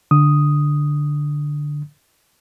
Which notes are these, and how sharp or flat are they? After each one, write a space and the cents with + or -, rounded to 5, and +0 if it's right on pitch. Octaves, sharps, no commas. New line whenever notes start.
D3 +0 D#6 +0